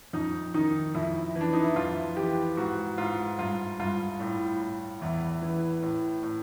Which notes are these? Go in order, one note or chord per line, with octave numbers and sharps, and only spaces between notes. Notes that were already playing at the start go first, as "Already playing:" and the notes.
F2 D#4
D#3 D#4
F2 E4
E3
D4
D#4
E4
F2 F4
E3 G4
G#2 F#4
G#2 F4
G2 F4
G2 F4
A2
A2
E2 E4
E3
A2
A2